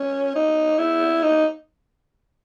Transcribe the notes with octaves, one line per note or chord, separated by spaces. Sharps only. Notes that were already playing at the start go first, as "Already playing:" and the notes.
Already playing: C#4
D#4
E4
D#4